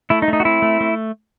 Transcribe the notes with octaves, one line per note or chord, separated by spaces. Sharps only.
A3 E4
D#4
A3
D#4
F#4
C4 E4
A3
A3